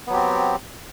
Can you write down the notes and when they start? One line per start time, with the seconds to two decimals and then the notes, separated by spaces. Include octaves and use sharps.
0.07 B3
0.10 F#3
0.13 G4
0.16 C4